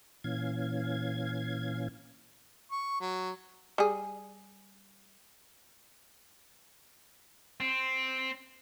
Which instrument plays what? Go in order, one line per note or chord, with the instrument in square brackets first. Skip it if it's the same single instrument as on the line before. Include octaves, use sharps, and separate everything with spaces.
[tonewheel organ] A#2 E3 C#4 F5 G#6
[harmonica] C#6
F#3
[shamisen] G3 G#4
[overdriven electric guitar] C4